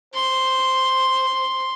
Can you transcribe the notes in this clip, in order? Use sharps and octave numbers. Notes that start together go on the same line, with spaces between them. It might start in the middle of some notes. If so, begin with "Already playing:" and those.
C5 C6